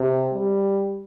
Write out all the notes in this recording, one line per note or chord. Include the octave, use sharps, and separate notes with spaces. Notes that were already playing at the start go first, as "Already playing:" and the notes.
Already playing: C3
G3